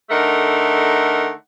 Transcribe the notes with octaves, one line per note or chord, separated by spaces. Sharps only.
D3 A3 D#4 A#4 F#5